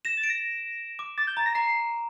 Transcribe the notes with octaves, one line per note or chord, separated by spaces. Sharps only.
A#6 E7
A6
D7
A#6
D6
D6 A6
G6
A#5 A6
A#6
A#5 C7